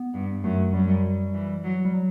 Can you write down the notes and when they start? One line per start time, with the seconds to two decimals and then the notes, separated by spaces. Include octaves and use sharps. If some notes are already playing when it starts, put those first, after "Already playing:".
Already playing: B3
0.14 G2
0.44 F#2 A3
0.73 F#2 G3
1.34 E3
1.64 F#3
1.85 G3
1.94 F#3